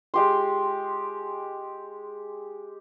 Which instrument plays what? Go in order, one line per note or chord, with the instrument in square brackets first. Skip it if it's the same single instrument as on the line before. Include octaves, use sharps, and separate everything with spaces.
[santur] G#3 G4 C6